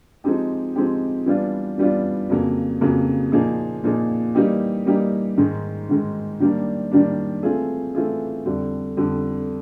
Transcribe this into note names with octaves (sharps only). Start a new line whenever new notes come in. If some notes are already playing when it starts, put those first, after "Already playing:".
F3 G#3 C4 D#4 G4
F3 G#3 C4 D#4 G4
E3 G3 B3 D4 F4
E3 G3 B3 D4 F4
F2 C#3 F#3 A#3
F2 C#3 F#3 A#3
A#2 F3 A#3 D#4 G#4
A#2 F3 A#3 D#4 G#4
E3 G3 A#3 D#4 G4
E3 G3 A#3 D#4 G4
G#2 D#3 G#3
G#2 D#3 G#3
D#3 G3 A#3 D4
D#3 G3 A#3 D4
E3 A3 C4 F4 G#4
E3 A3 C4 F4 G#4
F2 D3 G3
F2 D3 G3